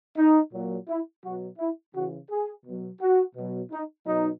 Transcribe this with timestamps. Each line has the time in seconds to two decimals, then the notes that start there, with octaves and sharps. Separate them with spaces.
0.17 D#4
0.53 A#2 F#3
0.88 E4
1.24 B2 F#3 F#4
1.59 E4
1.94 C#3 E3 F#4
2.30 G#4
2.65 B2 F#3
3.01 F#4
3.36 B2 F#3
3.72 D#4
4.06 B2 F#3 D#4